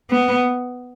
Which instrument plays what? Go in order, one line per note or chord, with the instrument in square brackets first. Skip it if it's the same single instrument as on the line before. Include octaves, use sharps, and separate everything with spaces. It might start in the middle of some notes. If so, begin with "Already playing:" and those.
[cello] B3